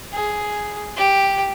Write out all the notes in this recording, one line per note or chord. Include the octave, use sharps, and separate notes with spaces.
G#4
G4